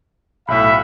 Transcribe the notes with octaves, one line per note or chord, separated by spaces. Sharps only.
B1 A2 E5 F5 B5